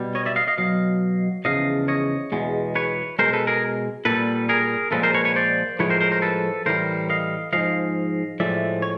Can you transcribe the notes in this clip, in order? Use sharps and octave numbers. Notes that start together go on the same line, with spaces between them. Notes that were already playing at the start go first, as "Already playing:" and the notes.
Already playing: B2 G3
C#5 D#5
D5 E5
D#5 F5
D#5 F5
B2 F#3 D#5 F5
E2 C#3 F3 D#5 F5
C#5 D#5
E2 B2 G#3
B4 C#5
B2 G#3 A#4 C5
A4 B4
G#4 A#4
A#2 G3 A4 B4
G#4 A#4
A#2 F3 G#3 A4 B4
A#4 C5
B4 C#5
B4 C#5
C5 D5
A2 F3 G#3 B4 C#5
A#4 C5
A#4 C5
A#4 C5
A4 B4
A2 E3 G3 A#4 C5
D#5 F5
G#2 F3 G#3 D#5 F5
A2 F3 G#3 D5 E5
C#5